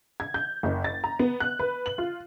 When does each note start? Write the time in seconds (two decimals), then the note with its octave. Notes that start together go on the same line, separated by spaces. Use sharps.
0.20 G#6
0.34 G6
0.63 F#1
0.84 A6
1.04 A#5
1.19 B3
1.40 F#6
1.59 B4
1.86 F#7
1.98 F4